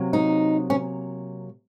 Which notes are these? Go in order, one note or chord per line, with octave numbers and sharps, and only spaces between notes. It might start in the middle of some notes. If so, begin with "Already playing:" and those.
Already playing: C3 F#3 A#3
D#4
C#4